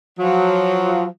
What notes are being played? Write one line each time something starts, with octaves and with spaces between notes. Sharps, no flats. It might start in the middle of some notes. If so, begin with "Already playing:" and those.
F3 F#3